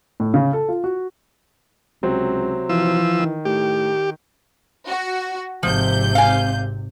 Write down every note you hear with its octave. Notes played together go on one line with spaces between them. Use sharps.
A2
C#3
A4
F4
F#4
C#2 C3 F#3 C4
E3 F3 E6
D#3
A2 G4
F#4
G#1 C3 F3 G6
F5 G#5